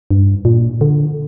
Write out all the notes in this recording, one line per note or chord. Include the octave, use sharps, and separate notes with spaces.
G2
A#2
D3